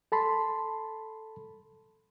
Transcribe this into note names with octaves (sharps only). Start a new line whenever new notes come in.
A4 A5 B5 C6